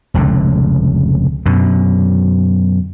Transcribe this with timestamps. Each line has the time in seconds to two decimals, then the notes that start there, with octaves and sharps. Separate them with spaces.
0.14 F1 C#2 A2 D3
1.46 F#2 B2 D3